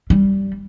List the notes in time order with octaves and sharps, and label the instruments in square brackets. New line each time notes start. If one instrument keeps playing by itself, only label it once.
[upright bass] G3